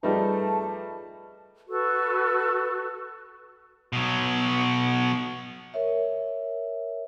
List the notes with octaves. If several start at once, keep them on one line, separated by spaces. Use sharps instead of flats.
F3 G3 A3 D#4 G#4 B4 A5
F#4 A4 B4 C#6
B2 F#3
A#4 C#5 E5